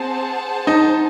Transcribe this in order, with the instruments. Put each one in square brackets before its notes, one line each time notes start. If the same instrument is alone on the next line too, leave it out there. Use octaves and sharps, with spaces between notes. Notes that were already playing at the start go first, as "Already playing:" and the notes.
Already playing: [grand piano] C4 [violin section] G#4 C5 F#5 A5
[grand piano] D#4